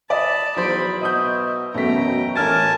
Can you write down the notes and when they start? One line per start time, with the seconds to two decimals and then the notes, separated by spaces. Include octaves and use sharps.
0.10 D5 E5 A5 B5 D#6
0.57 E2 F#3 D#4 C5 D5 B5
1.01 B2 D#5 E5 D#6 G6
1.74 E1 F#2 B2 A3 G5 A#5 B6
2.35 A1 A4 A#4 G#5 A5 F6 A6